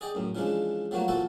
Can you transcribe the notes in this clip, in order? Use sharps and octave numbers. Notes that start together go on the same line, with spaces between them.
G#4 D5 D#5 G5
F#2 A2
C#3 E3 F3 G#3 D4
F3 F#3 A3 A#3 F#4
A#2 E3 F3 F#4 A4 A5